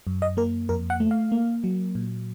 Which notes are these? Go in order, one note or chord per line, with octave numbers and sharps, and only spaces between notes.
F#2
D#5
A#3 A#4
F2 A#4
F#5
A3
F5
A#3
F#3
A#2